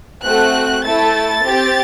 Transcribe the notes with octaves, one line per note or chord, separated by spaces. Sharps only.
A3 C4 F#4 F#6
A3 E4 A4 A6
C4 G4